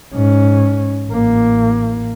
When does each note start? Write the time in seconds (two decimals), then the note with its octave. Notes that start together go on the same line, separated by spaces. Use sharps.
0.14 G#2 C#4
1.08 A1 A#3